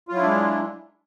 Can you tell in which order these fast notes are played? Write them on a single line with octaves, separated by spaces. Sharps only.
F4 F#3 E4 D4 G#3